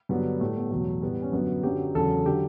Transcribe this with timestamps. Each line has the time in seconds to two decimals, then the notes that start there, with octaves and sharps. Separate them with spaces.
0.09 G2 D3 F#3 B3
0.40 A2 G3 A3
0.57 B3
0.71 E2 B2 F#3 A3
1.02 A2 G3 B3
1.22 C#4
1.32 F#2 D3 F#3 B3
1.63 F#2 D3 F#3 G4
1.95 E2 C#3 F#3 A4
2.26 D3 F#3 G4